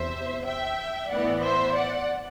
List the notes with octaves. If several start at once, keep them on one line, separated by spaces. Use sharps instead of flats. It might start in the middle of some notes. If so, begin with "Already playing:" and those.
Already playing: E2 C3 C5 E5
E5 G5
A2 E3 B3 D5 F#5
C5 E5
D5 F#5